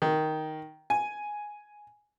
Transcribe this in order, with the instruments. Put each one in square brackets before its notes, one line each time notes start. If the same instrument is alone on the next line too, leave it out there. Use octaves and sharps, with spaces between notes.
[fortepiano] D#3
G#5